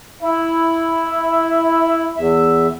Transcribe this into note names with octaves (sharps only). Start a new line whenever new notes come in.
E4 E5
E2 E5